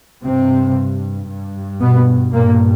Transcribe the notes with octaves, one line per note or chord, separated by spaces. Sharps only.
G2 C3 C4
G2
B2 B3
G2 A#2 A#3